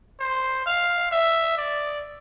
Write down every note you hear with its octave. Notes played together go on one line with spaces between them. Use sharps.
C5
F5
E5
D5